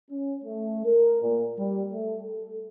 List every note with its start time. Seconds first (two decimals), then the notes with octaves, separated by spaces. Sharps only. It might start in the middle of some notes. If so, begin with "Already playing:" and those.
0.11 C#4
0.44 A3
0.86 A#4
1.22 A#2
1.58 G3
1.93 A3
2.22 A4